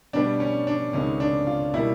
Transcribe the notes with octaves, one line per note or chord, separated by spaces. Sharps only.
B2 G3 B3 D4
C#4
D4
C#2 C3 D#3 G#3 C#4
D4
F4
B2 G3 A#3 E4